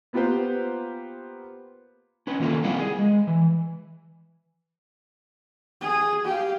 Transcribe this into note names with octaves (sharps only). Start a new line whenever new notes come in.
A#3 B3 F4 G4 B4 C5
C#4 B4
D#3 A#3 F4 A4 A#4
G3 C4 E4 F5 F#5
G#4
G#3
E3
G#4
G4 F5